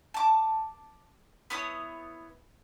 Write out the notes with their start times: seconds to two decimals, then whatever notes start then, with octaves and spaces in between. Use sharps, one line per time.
0.14 A5 D6
1.50 B3 E4 C#5 D#6